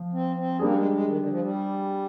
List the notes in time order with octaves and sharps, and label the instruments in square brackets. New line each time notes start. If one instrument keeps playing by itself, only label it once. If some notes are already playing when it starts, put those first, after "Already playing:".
Already playing: [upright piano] F3
[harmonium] C4
C4
[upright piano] G3 D4 G#4 [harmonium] A#3
[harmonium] G#3
G#3
D#3
D3
F3
G3